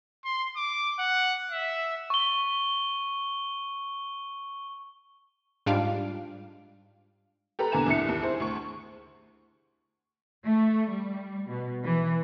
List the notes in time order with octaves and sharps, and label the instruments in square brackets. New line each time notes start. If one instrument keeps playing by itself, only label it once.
[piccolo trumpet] C6
D6
F#5
E5
[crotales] C#6 G7
[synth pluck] G#2 G3 D4 F4 F5 D7
[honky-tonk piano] G4 A4 B4 A#5
E2 D3 A#3 G#5 A#5 E7
C2 D3 E4 C#7
D#2
E4 G#4 C5
D2 C#6
[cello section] A3
G3
B2
E3